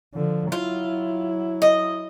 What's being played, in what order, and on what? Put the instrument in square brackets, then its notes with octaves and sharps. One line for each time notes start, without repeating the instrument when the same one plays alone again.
[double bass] D3 F3
[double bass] F#3 E4 [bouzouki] F4
[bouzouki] D#5